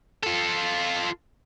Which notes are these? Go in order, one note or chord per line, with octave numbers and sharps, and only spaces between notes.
F4 A4